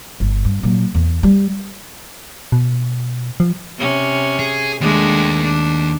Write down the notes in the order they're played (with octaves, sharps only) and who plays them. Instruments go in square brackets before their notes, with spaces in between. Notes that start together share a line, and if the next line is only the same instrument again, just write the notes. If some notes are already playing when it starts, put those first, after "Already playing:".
[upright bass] G1
G2
A#2 F#3
E2
G3
[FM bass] B2
F3
[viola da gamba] C3 C#4
[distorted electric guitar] G#4
[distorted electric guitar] D#2 [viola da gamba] G#3 A3 D4
[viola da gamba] D4